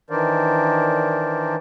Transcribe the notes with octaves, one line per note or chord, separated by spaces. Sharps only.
D#3 E3 D4 A#4 C5 D5